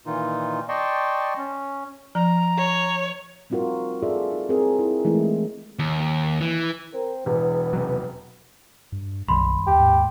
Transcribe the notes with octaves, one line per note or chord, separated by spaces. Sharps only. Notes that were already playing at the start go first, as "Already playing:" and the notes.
A#2 D#3 E3 D#4 F4
D5 D#5 G5 A5 C6 C#6
C#4
F3 A#5
C#5
G3 C4 D#4 F4 F#4 A#4
F4 G#4 A4 D5 E5
D#4
C4 E4 G#4 A#4
E4
E3 G#3 A3 D#4 E4
D#2
E3
C4 A#4
E1 E2 E3 B3
C3 F#3
G2
B1 F#2 D#3 G3 B5 C6
D#2 G4
G#2